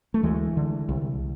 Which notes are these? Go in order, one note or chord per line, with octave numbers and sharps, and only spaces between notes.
A3
D2 E3 G#3
D3
C2